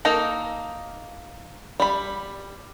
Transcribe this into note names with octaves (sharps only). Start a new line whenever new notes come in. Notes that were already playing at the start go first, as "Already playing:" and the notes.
A#3 D#4 A4 A#5
G3 B5